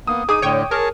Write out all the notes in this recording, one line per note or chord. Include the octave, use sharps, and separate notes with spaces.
A#3 B3 D#6
D#4 G#4 D6 D#6 D#7
A2 D3 C#5 G5
G#4 A#4 C#5 A5